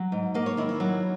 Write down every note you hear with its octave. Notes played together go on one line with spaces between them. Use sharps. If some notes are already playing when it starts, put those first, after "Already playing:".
Already playing: F#3
G#2
A#3 D#5
C#5
D#3 E4
E4
F#3